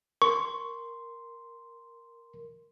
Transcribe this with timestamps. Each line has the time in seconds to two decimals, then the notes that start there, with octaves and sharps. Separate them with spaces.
0.22 A#4 C6 C#6